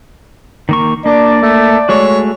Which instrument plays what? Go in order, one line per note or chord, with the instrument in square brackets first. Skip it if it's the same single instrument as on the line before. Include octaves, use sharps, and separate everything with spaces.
[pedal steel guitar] D#3 A#3 C#6
[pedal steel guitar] A#3 [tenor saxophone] D4 [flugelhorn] D5
[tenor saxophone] A3
[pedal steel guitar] G#3 A3 F#4 [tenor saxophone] C#5